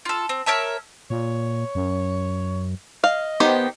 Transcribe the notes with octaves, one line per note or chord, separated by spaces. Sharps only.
F4 A4
C4
A#4 C#5 E5 A5
A#2 C#5
F#2
D#5 F5
D#3 B3 G4 C5